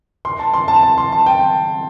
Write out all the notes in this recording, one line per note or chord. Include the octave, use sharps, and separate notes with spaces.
C6
A5
C6
A5
A5
C6
A5
G5